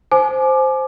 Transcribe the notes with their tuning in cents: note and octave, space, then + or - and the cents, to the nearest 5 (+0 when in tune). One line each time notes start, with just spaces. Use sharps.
C5 +0 G#5 +40 D6 +20